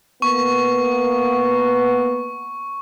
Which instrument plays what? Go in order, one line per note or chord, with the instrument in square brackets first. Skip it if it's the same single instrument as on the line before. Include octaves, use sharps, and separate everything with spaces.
[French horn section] A#3 B3 [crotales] C#6